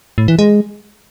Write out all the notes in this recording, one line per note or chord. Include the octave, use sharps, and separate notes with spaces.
A2
E3
G#3